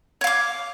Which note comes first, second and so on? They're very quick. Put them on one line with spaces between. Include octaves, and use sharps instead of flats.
C#5 F5 D6